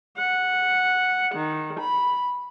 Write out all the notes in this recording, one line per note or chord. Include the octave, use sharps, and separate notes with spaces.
F#5
D#3
B5